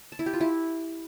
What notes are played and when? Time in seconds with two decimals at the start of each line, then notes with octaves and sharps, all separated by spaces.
0.12 A5
0.19 E4
0.26 G4
0.33 F4
0.41 E4